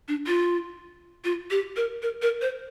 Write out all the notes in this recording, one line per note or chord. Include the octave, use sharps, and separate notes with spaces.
D4
F4
F4
G4
A#4
A#4
A#4
C5